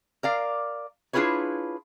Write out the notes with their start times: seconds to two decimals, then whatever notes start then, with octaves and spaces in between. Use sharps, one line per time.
0.23 A#4 D5 F5
1.13 D4 E4 F4 G#4 B4 C#5